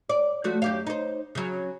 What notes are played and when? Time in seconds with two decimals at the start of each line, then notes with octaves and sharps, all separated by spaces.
0.09 D5
0.44 F3 A3 F#4
0.62 F#2 G4 F5
0.87 D#4 C5
1.35 C#3 F#3